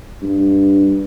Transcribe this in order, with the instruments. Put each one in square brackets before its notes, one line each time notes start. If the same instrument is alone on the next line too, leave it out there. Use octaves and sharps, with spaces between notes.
[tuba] G2